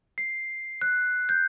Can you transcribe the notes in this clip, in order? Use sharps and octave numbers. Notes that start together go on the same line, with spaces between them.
C7
F#6
G6